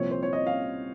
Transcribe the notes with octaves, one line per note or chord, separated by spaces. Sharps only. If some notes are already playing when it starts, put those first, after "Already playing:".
Already playing: C2 A#2 F3 C4 C#5
C5
C#5
D#5
F5